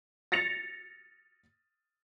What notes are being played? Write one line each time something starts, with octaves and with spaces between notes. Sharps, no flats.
A6 A#6 C#7 F7